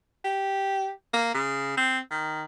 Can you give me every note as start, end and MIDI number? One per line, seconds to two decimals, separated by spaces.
0.25 0.90 67
1.13 1.34 58
1.34 1.76 49
1.77 1.98 60
2.11 2.43 51